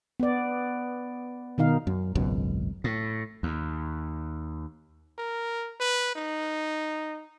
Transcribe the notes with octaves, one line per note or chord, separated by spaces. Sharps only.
B3 D5
B2 D#3 D#4 F5
F#2
G#1 C#2 F#2 B2
A2
D#2
A#4
B4
D#4